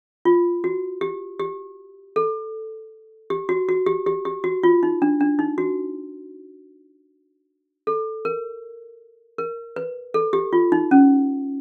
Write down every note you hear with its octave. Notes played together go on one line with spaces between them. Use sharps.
F4
F#4
G4
G4
A4
G4
F#4
F#4
G4
G4
G4
F#4
F4
D#4
D4
D4
D#4
F#4
A4
A#4
A#4
B4
A4
G4
F4
D#4
C#4